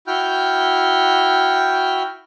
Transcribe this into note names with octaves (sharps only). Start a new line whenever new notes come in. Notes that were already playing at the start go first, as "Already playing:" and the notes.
E4 F#4 G5 F6 G6